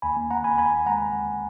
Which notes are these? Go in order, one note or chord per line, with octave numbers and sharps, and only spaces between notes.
D#2 G#5 B5
A#3
A#3 F#5 A#5
D#2 G#5 B5
D#2 G#5 B5
D#2
G#3 F#5 A#5